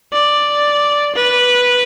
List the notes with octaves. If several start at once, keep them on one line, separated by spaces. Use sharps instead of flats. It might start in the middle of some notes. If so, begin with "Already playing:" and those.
D5
B4